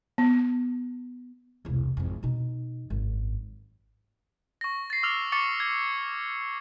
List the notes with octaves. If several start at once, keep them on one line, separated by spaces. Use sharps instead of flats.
B3
E1 C2
G#1 F2
B2 D#4
G#1 F#2
C#6 A#6
A6 C7
D6 E6 F6 F7
C#6 D6 A6 C#7
G#6